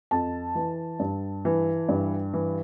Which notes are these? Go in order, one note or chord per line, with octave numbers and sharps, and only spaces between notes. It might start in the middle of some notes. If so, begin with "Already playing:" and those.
F2 A5
E3
G2
E3
G2
E3